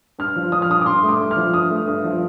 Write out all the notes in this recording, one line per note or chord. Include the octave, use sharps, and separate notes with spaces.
G2 F6
F3
F3 D#6
F6
G2 D#6
D6
G2 C6
A3
D6
G2
F6
F3
G2 D#6
A3
G2
F3